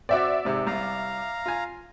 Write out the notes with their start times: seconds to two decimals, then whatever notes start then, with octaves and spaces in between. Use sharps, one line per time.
0.09 C4 F#4 D5 E5 D6
0.45 G#2 C3
0.67 C2 F5 A#5
1.46 F4 G#5